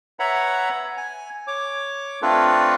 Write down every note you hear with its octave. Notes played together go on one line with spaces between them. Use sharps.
B4 C#5 E5 F#5 A#5 B5
G#5
C#5 D6
A3 C4 D4 F4 A4 B4